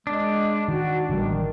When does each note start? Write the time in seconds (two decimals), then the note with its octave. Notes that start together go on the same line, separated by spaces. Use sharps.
0.07 G#3 D4
0.68 D#3 F#4
1.10 A1 D3 D#3 G3